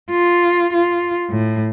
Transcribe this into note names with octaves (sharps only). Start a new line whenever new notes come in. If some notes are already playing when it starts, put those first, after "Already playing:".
F4
F4
A2